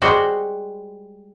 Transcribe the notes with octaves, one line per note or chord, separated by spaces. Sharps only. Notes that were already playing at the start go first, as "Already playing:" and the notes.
G3 G#3 F#4 C5